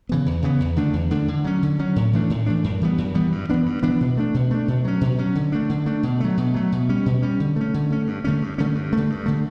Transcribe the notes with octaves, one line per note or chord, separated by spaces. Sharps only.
C#3 E3 B3
E2
C#3 E3 B3
E2
D3 A3 D4
E2
D3 A3 D4
D3
F#3 C#4
D3
F#3 C#4
A2
E3 A3 D4
A2
E3 A3 D4
F#2
E3 G3 B3
F#2
E3 G3 B3
G2
E3 B3 D4
G2
E3 B3 D4
B2
A3 D4
B2
A3 D4
B2
F#3 C#4
B2
F#3 C#4
D3
A3 D4
D3
A3 D4
B2
F#3 A3
B2
F#3 A3
B2
G3 C#4
B2
G3 C#4
D3
A3 C#4
D3
A3 C#4
G2
D3 A3 C#4
G2
D3 A3 C#4
G2
D3 A3
G2
D3 A3